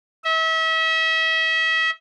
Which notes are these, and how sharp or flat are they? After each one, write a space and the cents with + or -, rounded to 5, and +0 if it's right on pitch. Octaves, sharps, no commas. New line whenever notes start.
E5 -35